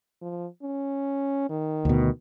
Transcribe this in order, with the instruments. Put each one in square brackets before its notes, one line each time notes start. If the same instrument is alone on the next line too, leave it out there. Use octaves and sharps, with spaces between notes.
[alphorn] F3
C#4
D#3
[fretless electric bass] D2 B2